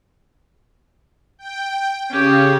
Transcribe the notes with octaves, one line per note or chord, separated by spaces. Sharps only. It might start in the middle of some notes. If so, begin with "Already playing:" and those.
G5
C#3 C#4 G4